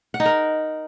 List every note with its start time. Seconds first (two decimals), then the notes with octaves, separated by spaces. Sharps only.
0.14 F#5
0.20 D#4
0.25 A#4